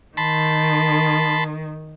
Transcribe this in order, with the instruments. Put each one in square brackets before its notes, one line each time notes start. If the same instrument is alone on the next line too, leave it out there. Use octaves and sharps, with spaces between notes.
[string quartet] D#3 [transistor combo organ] A5 B5 C6